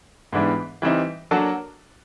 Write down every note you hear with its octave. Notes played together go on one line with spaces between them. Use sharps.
G#2 E3 G3 B3 D4
E3 G3 C4 D#4
F#3 A#3 D4 F#4 A4